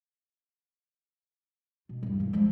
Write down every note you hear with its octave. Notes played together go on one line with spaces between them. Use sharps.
B2
E2 G2
D#3 E3
F3 G#3